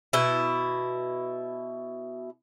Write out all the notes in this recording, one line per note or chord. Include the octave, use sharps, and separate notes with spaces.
B2 E4